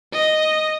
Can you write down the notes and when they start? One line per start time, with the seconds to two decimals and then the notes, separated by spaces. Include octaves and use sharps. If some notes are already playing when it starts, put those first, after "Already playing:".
0.13 D#5